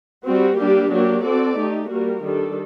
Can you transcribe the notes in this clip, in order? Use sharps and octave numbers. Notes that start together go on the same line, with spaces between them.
G3 C4 F#4
G3 A#3 D4 G4
F#3 A#3 D4 G4
C4 F#4 A4 D5
A3 D#4 G4
G3 A#3 F#4 A#4
D#3 G3 D4 A4